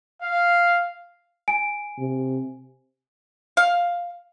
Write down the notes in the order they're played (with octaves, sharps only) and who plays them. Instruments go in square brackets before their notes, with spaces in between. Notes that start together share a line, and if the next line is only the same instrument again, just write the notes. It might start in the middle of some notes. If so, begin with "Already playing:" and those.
[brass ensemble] F5
[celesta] G#5 D7
[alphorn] C3
[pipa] F5